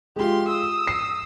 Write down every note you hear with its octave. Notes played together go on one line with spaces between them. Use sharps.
G#3 F4 G4 C6
D#6 E6
C7